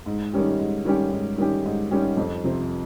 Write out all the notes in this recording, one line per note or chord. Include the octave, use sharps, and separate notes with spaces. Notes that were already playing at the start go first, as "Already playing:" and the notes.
G#2
D#3 G3 C#4 G4
G#2
D#3 G3 C#4 G4
G#2
D#3 G3 C#4 G4
G#2
D#3 G3 C#4 G4
F2
C3 F3 C4